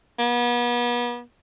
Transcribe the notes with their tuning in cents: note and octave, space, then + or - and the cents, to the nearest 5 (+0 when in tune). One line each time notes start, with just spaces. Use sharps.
B3 -35